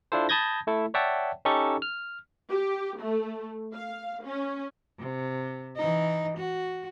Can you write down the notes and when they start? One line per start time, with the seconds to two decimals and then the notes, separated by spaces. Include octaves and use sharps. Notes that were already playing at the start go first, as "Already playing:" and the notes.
0.12 D4 E4 F4 A4 C5
0.29 A5 B5 D#6 G6 G#6 A#6
0.67 A3 E4 A4
0.94 C#5 D5 E5 F#5 G5 A5
1.45 C#4 D#4 G4 A4 C#6
1.82 F6
2.50 G4
2.99 A3
3.73 F5
4.24 C#4
4.99 C3
5.76 E3 D#4
6.37 F#4